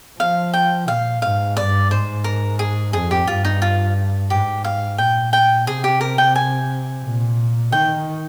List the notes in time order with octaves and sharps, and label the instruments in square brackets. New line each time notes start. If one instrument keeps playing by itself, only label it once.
[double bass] F3 [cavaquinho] F5
[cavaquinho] G5
[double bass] A#2 [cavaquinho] F5
[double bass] G#2 [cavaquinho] F5
[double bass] G2 [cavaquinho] D5
[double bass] G#2 [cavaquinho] C5
[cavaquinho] A#4
G#4
[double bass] F2 [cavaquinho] G#4
[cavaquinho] G4
[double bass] G2 [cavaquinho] F4
[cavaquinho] D#4
F4
[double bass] G#2 [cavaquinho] G4
[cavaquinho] F5
[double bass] A#2 [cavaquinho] G5
[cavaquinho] G5
[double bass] C3 [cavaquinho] G#4
[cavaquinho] G4
A#4
G5
G#5
[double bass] A#2
[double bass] D#3 [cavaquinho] G5